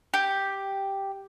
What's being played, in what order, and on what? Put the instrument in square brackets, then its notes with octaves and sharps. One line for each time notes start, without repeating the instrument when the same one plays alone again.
[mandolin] G4